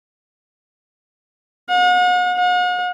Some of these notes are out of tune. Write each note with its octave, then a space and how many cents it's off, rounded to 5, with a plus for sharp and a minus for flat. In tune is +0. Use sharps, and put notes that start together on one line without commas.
F#5 -45
F#5 -45